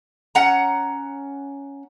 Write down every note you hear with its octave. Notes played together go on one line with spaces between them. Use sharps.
C#4 F#5 A#5